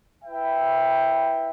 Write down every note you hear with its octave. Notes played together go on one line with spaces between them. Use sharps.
E4 B4 E5 G5